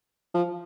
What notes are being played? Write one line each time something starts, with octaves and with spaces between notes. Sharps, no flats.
F3